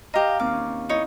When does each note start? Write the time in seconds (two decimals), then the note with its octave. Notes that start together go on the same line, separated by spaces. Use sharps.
0.14 G4 D#5 F5 A#5
0.39 D#2 C4 D6 F6
0.53 C#4
0.89 D#4 E4 C#5 D#6